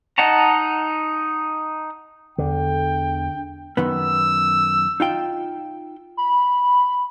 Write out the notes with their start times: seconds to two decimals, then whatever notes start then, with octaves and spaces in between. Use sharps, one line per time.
0.18 D#4 D#5 F#5 A5 A#5
2.38 E2 D3 G5
3.77 F#2 D#3 B3 E6
5.00 D#4 F4 G5
6.17 B5